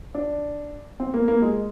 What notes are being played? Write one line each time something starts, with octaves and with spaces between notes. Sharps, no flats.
D4
C4
A#3
A#3
G#3